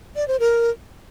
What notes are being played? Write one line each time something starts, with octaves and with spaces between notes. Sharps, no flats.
D5
C5
A#4